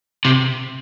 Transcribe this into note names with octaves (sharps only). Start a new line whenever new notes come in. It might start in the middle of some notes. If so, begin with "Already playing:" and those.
C3